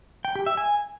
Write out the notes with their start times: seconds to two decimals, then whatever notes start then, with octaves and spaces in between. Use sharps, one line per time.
0.25 G5
0.35 G4
0.46 E5
0.57 G#5